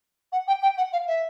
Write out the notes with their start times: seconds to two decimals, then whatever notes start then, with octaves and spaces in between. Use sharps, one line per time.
0.32 F#5
0.48 G5
0.62 G5
0.77 F#5
0.92 F5
1.08 E5